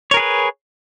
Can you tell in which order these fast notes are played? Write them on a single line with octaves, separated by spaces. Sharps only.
C#5 A#4 G#4 B4